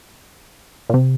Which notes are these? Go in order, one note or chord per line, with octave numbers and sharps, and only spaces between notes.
A#2
C3